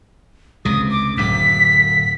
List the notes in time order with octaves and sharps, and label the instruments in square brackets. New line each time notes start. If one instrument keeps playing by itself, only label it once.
[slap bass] C#2 C3 [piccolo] D#6
[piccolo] D6
[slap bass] D1 F#2 [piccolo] B6